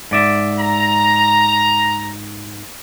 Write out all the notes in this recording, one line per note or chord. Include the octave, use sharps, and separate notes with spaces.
G#2 D5 E5
A#5